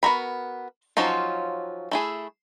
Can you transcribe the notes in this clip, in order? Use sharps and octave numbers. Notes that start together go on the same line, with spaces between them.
B3 F#4 A#4 B5
F3 F#3 C#4 D#4 F4
A3 E4 G#4